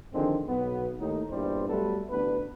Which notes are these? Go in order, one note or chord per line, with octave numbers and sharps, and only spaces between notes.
D3 D#3 F3 G#3 C4
B1 B3
D#2 A2 D#4
E2 G2 A#2 E3 G3 C5
F#3 G3 A3 B3 A4 B4
A1 D2 B3 D4 B4